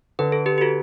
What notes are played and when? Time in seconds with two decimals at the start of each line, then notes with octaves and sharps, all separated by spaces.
0.19 D3 B4
0.32 A4
0.46 G4 B4
0.58 G4
0.61 F#4 A4